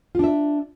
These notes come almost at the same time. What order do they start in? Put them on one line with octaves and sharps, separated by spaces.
F4 D4 E5